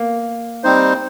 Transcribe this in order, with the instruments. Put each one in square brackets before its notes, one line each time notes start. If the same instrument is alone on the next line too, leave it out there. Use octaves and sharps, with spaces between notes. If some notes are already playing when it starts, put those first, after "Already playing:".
Already playing: [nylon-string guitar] A#3
[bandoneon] G3 C4 D#4 C5